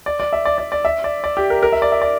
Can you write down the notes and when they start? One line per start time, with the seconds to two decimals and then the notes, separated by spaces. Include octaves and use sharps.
0.06 D5
0.20 D5
0.33 E5
0.45 D5
0.58 D5
0.72 D5
0.85 E5
1.04 D5
1.24 D5
1.37 G4
1.50 A#4
1.63 A#4
1.73 E5
1.82 D5
1.92 E5
2.02 D5